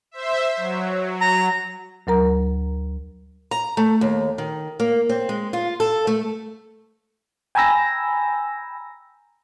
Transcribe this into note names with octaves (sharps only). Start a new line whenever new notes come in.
C5 E5
F#3
A#5
D2 F#3 A#4 A#5
A#5
A3
D#2
D#3
A#3
C4
G#3
F4
A4
A3
G5 G#5 A#5 B5 E6 A#6